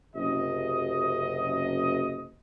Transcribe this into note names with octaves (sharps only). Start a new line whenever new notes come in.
F#1 C3 D#5